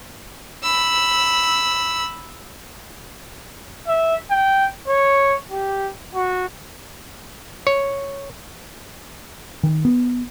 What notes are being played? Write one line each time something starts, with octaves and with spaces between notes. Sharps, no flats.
B5 E6
E5
G5
C#5
G4
F#4
C#5
D#3
B3